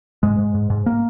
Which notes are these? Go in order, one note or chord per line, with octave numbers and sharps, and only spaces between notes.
G#2 G#3
G#2
G#2
G#2
A#3